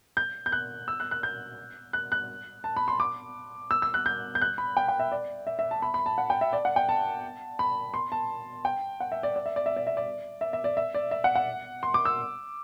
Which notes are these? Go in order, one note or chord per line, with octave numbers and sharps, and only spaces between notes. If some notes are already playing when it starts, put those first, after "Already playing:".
G6
G6
F#6
E6
F#6
F#6
G6
F#6
F#6
A5
B5
C6
D6
E6
E6
F#6
G6
G6
F#6
B5
G5
G5
E5
D5
E5
E5
A5
B5
B5
A5
F#5
G5
E5
D5
F#5
G5
A5
B5
C6
A5
G5
F#5
E5
D5
D5
E5
D5
E5
D5
E5
D5
E5
E5
D5
E5
D5
E5
F#5
F#5
C6
D6
E6